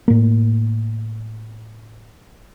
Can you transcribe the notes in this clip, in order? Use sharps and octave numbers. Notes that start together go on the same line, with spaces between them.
A2 A#3